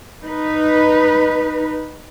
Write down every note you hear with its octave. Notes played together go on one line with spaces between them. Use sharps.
D#4 B4